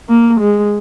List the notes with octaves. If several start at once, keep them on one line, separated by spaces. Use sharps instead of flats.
A#3
G#3